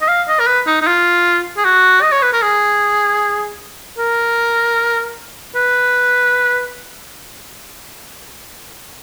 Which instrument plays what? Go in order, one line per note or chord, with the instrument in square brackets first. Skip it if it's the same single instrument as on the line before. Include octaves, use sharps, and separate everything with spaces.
[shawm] D#5
F5
D#5
A#4
B4
D#4
D#4
F4
G#4
F#4
D#5
C#5
B4
A#4
G#4
A#4
B4